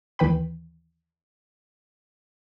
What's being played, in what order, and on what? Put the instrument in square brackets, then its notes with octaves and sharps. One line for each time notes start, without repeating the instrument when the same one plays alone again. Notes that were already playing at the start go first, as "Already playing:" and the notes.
[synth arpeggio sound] D#2 D#3 E3 B4 G5 B5